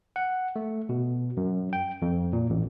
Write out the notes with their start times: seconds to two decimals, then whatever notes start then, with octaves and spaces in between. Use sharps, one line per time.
0.16 F#5
0.56 A3
0.89 B2
1.37 F#2
1.73 G5
2.02 F2
2.33 A#2
2.50 A1